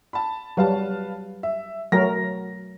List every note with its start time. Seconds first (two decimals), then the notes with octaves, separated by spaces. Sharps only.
0.13 A5 B5
0.57 F#3 G3 B4 F5 A5
1.43 E5
1.92 F#3 A3 A#4 A#6